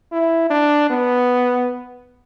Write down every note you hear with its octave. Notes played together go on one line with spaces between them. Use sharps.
E4
D4
B3